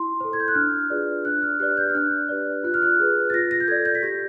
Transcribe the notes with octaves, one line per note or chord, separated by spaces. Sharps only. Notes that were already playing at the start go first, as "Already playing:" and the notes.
Already playing: E4 C6
A4 C5
G#6
G6
F#6
D4 F6
F4 G#4 B4 D5
D4 F#6
F6
G4 B4 D5 F#6
G6
F6
D4 F#6
G4 B4 D5
F4 F#6
F6
F#6
G#4 B4
A6
F4 A#6
A#6
G6
A4 D5 G#6
G6
B6
G4 A#6